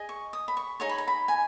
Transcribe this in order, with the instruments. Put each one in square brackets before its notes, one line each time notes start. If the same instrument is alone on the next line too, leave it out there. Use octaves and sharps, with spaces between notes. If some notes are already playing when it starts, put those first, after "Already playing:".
Already playing: [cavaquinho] G#4 D#5
C#6
D#6
B5
C#6
D#4 G#4 C#5 C#6
B5
A#5
B5
G#5